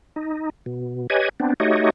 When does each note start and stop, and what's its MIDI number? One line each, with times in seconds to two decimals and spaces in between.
0.16 0.50 63
0.66 1.07 47
1.10 1.29 67
1.10 1.29 71
1.10 1.29 73
1.10 1.29 75
1.10 1.29 80
1.40 1.54 59
1.40 1.54 60
1.40 1.54 62
1.60 1.90 57
1.60 1.90 63
1.60 1.90 66
1.60 1.90 67
1.60 1.90 73
1.60 1.90 75